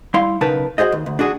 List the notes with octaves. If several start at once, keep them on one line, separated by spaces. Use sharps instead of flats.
G3 E4 F5 C6
B1 C#3 D#4 A#4 B4 A5
F#4 G#4 C5 D#5
D#2
D2
D4 F#4 G#4